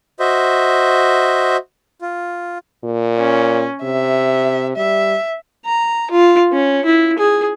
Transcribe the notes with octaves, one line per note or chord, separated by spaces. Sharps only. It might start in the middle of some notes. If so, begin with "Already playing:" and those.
F#4 C5 D#5 E5
F4
A#2
C#4
C3 E5
G3 E5
A#5
F4
C#4
E4
G#4